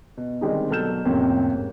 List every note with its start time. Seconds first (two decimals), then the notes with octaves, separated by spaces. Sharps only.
0.17 B2
0.41 D3 D#3 G3 G#3 C4 D#4
0.70 B2 F#3 A4 F6 G6 E7
1.05 F2 A2 C3 A#3 C#4
1.51 G#2